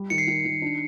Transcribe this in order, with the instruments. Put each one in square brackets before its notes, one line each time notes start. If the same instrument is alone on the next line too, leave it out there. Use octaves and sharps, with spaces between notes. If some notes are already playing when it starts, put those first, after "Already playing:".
Already playing: [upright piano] G3
[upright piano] D#3 [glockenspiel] C#7
[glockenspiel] C7
[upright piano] D#3
D#3
D4